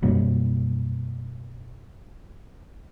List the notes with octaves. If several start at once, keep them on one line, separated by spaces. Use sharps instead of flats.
F#2 B2 G3 A#3